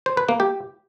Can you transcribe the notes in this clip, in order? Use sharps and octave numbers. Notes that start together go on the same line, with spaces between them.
C5
B4
A#3
G4